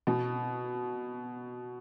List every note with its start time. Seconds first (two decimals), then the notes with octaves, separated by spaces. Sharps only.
0.07 B2